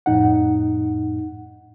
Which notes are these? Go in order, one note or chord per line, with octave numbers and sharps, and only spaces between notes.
F2 A2 D#4 F#5